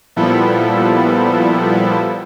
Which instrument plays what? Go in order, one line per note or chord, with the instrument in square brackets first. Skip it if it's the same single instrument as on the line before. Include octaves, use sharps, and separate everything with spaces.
[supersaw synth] A#2 F3 G3 B3 E4 A4